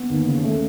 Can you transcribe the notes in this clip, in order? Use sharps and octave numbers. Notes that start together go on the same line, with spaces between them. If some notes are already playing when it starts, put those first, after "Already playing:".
Already playing: B3
D#2
C#3
A3